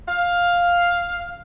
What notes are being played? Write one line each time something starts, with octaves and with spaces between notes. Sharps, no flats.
F5